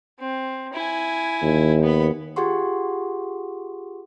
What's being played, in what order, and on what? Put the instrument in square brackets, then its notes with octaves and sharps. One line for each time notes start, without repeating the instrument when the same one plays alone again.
[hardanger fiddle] C4
E4 G#5
[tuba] D#2
[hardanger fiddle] B3 B5
[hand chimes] F4 G4 G#4 F#5 C6 C#6